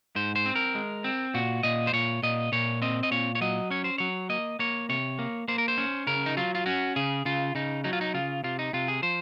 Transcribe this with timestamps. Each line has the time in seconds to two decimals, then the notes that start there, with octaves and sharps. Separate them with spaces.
0.16 G#2 C5
0.36 C5
0.46 C4
0.56 A#4
0.75 G#3
1.04 C4
1.34 A#2 F#4
1.63 A#2 D#5
1.87 C5
1.93 A#2 C#5
2.23 A#2 D#5
2.52 A#2 C#5
2.82 C4 D#5
3.03 D#5
3.11 A#2 C#5
3.35 C#5
3.41 F#3 D#5
3.70 C#4 C#5
3.84 C5
3.98 F#3 C#5
4.30 A#3 D#5
4.59 A#3 C#5
4.89 C3 C#5
5.19 A#3
5.48 A#3 C5
5.58 A#4
5.68 C5
5.78 C#4
6.07 C#3 A#4
6.26 D#4
6.37 F#3 F4
6.55 F4
6.66 C#4 F#4
6.96 C#3 G#4
7.25 C#3 F4
7.55 C#3 D#4
7.84 F#3 D#4
7.93 F4
8.01 D#4
8.14 C#3 F4
8.44 C3 F4
8.59 D#4
8.73 C3 F4
8.88 G#4
9.02 F3 C5